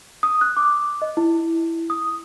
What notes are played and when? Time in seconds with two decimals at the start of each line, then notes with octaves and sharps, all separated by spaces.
0.23 D#6
0.41 F#6
0.57 D6
1.02 D#5
1.17 E4
1.90 D#6